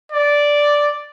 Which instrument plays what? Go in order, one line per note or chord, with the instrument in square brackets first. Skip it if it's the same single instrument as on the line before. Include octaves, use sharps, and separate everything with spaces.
[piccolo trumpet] D5